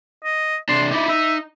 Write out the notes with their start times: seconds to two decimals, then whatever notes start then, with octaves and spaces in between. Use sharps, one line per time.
0.24 D#5
0.69 C3 D4 C6
0.92 D#4 E4 D5
1.09 D#4 E5